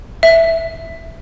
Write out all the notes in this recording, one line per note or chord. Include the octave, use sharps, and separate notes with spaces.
E5